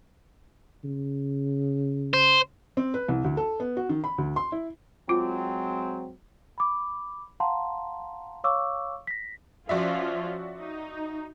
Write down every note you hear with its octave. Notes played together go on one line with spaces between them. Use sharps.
C#3
C5
C4
B4
C2
D2
A4
B3
F#4
D#3
B5
D2
C6
E4
F#3 G#3 C4 F4
B5 D6
F5 F#5 A5 A#5 C6
C#5 F5 C#6 D6 E6
A#6 B6
F3 C#4 F4 F#4 D5 E5
D#4